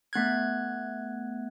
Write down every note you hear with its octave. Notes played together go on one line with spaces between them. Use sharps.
A3 B3 F#6 G#6